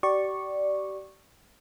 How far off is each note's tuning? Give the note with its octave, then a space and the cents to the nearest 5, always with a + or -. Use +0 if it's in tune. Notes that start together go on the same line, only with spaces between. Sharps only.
G4 -35 D5 +0 C#6 -10